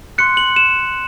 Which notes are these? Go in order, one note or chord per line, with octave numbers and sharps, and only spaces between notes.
C6 F#6 C#7
F#7
E7